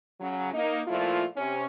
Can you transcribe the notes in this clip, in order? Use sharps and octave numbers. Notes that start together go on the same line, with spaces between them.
C#3 F#3
A#3 D#4
A#2 F3 A3 E4 F4
C3 C#4